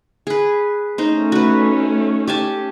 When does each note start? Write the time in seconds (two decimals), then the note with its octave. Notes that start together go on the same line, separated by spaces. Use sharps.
0.27 G#4 B4
0.98 A3 C#4 D#4 C5
1.32 F#4 B4
2.28 G4 G#5 A5